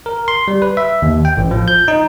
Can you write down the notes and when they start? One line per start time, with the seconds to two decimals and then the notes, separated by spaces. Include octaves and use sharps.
0.06 A#4
0.28 C6
0.48 G3
0.62 B4
0.77 E5
1.02 D#2
1.25 G5
1.37 A1
1.51 F3
1.68 G6
1.88 D#4